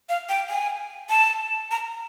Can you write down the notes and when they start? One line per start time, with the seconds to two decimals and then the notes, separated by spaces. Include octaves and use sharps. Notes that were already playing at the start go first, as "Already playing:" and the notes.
0.09 F5
0.29 G5
0.49 G#5
1.09 A5
1.71 A#5